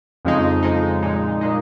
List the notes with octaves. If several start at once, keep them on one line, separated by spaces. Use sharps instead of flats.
F2 C#3 F3 G#3 D#4
F2 C#3 F3 G#3 D#4
A#2 G#3 D#4
A#2 G#3 D#4